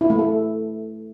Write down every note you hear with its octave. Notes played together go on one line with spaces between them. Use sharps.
E4
A3
A4